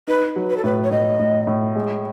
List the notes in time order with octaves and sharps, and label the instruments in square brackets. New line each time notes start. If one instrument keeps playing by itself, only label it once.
[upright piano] D#4 [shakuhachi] B4
[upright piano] F#3
[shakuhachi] B4
A4
[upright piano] A2 [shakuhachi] B4
[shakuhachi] C#5
[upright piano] A2 [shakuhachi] D#5
[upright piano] A2
A2
G#3